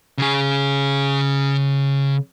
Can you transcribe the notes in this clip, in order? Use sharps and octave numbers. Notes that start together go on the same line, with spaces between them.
C#3 G#4